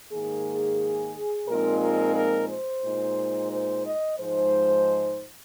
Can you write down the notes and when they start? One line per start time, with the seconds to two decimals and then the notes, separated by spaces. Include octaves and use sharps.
0.12 G#2 D#3 A#3 G#4
1.48 A#2 F3 G#3 C4 D#4 A#4
1.81 A#4
2.15 A#4
2.50 C5
2.84 A#2 G#3 D#4
3.51 C5
3.85 D#5
4.19 G#2 F3 G#3 D#4 C5